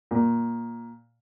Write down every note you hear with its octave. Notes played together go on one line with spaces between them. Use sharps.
A#2